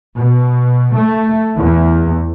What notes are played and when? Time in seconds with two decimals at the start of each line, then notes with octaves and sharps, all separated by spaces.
0.19 B2
0.97 A3
1.57 E2